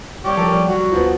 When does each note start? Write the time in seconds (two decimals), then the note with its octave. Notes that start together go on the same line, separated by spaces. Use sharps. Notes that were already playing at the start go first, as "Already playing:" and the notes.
0.25 G3 G4 C#5
0.37 F3 A4 A#4
0.51 G3
0.68 F#3 F#4
0.92 D2 F3 B3